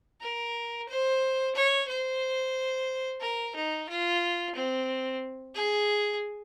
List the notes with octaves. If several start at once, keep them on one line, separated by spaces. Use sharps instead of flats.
A#4
C5
C#5
C5
A#4
D#4
F4
C4
G#4